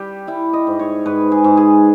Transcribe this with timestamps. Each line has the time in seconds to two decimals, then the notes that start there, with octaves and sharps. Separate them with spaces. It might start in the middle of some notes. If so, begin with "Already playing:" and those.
Already playing: G3 G4
0.27 G3 E4
0.53 D#5
0.67 G#2
0.79 C#5
1.06 G#2 B4
1.32 G#4
1.44 G#2
1.57 G#4